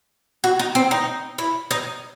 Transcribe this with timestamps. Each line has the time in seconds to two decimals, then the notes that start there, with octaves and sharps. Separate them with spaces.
0.44 F#4
0.59 D#4
0.75 C4
0.91 D#4
1.38 E4
1.71 D#4